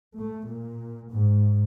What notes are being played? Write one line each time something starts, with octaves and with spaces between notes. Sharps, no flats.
A3
A#2
G#2